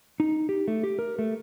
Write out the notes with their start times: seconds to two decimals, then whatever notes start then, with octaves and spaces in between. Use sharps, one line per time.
0.20 D#4
0.49 G4
0.68 A3
0.83 G4
0.99 A#4
1.19 A3